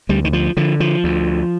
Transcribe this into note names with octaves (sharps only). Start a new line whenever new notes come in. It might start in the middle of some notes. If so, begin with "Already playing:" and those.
D2 G3
D#3
F3
D3 F3
F3
D2